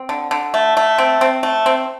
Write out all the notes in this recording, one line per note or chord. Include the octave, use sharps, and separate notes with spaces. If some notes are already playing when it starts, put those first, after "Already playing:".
Already playing: C4
D3
D3
A3
A3
C4
C4
A3
C4